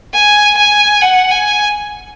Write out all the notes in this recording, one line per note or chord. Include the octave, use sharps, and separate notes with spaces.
G#5
G#5
F#5
G#5